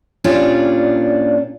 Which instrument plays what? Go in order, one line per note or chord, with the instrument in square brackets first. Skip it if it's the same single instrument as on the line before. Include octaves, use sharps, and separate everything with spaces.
[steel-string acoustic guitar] A#2 C#4 D4 F4 G4 D5